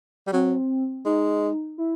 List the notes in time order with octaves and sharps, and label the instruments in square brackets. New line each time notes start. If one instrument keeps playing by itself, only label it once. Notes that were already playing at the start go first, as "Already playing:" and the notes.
[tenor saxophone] G3
[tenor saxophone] F#3 [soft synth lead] C4
[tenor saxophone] G#3 [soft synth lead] D#4
[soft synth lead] E4